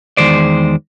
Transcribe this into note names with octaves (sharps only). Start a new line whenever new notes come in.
E2 D#3 G#3 C5 D5